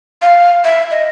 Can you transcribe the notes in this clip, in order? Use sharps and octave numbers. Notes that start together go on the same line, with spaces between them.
F5
E5
D#5